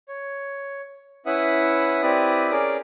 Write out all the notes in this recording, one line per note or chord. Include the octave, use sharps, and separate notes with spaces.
C#5
C#4 E4 B4 E5 F#5 D#6
C4 E4 G4 B4 D5 D#6
C#4 G#4 A#4 D5 D6